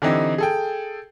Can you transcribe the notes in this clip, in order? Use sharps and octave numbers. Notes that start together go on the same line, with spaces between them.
D3 E3 C4 D#4 E4 G4
G#4 A4 G5